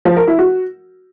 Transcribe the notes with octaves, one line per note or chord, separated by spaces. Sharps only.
F3
A#4
E4
F#4